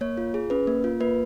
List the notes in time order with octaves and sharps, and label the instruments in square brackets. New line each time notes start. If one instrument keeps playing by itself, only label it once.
[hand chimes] A#3 C#5
F4
G#4
C#4 B4
A#3
F4
A#3 B4